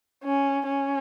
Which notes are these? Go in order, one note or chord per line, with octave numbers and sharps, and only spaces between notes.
C#4
C#4